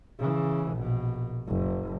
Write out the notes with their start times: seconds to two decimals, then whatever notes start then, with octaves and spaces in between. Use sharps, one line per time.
0.19 C#3 E3
0.73 A#1 B2
1.48 F#1